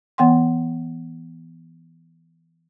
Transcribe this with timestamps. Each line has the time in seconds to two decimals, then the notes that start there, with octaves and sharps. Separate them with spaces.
0.18 E3 B3 F#5 G5 C6